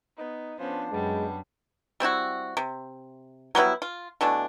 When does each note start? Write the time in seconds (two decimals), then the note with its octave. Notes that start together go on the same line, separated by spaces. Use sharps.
0.18 B3 D#4
0.60 F3 B3 C#4 D4 C5
0.92 F#2 G3 G#3 B3
2.00 G3 C4 E4 F#4
2.57 C3
3.55 F#3 G3 B3 E4
3.82 F4
4.21 B2 E3 A3 D4